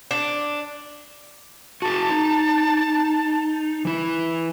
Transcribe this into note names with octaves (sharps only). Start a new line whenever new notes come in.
D4
F#4 G#4 A5
D#4
E3 E4